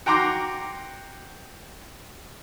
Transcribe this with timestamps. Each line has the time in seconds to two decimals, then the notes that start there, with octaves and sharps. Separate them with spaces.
0.06 F#4 G5 A#5 C6 D6